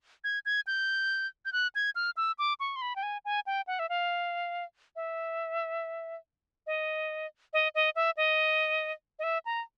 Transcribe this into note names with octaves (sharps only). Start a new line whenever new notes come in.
G#6
G#6
G6
G6
F#6
G#6
F6
E6
D6
C#6
C6
B5
G5
G#5
G#5
G5
F#5
E5
F5
E5
D#5
D#5
D#5
E5
D#5
D#5
E5
A#5